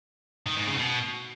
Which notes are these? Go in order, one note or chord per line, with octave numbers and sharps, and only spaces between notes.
D#3
G#2
C#3
B2